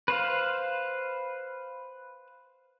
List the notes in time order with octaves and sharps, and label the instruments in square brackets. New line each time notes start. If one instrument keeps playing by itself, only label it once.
[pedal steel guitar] B4 C5 F5